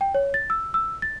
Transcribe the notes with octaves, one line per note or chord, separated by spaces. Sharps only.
G5
C#5
A6
E6
E6
A6